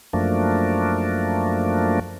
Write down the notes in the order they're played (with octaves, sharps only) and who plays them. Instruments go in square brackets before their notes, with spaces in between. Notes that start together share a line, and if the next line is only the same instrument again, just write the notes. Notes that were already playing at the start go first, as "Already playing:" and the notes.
[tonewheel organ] F#2 F3 A3 A#3 D4